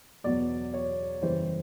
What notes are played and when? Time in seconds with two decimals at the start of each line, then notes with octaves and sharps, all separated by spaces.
0.24 E2 B2 F#3 B3 D5
0.74 C#5
1.22 F#2 C#3 E3 G3 C5